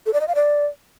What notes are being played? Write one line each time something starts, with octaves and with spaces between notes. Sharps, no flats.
A4
D5
D#5
F5
D5